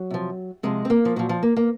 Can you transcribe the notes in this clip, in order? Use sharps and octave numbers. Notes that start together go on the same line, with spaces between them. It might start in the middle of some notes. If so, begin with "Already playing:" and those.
Already playing: F#3
C3 F3
C3 F3 G#3
C4
A#3
F3
A#2 F3 F#3
F3
A#3
A#3